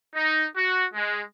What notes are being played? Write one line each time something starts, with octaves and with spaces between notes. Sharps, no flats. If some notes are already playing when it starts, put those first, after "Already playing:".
D#4
F#4
G#3